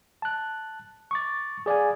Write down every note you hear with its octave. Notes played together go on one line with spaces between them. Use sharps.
A5 F#6
C#6 D6 A6
G#4 D5 F5 G#5